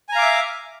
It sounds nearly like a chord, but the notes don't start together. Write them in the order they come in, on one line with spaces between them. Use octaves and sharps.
G#5 A#5 F5 D6 E5